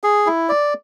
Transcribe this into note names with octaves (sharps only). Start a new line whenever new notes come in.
G#4
E4
D5